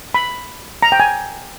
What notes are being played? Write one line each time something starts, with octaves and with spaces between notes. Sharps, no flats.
B5
A#5
G5
G#5